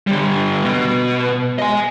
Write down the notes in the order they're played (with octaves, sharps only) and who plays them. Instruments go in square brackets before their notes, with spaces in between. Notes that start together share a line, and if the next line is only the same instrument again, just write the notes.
[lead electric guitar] D3 G3
B2
D#5 G#5